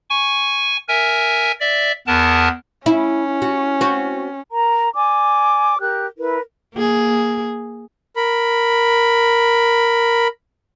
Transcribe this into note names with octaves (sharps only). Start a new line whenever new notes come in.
G#5 C#6
A#4 E5 G#5
D5 E5
E2 B3 A#4 A5
C#4 E4
F#4
C4 F#4
A#4 A#5
D5 G#5 D6
G4 A#4 F#6
E4 A#4 B4
A#3 G#4
A#4 B5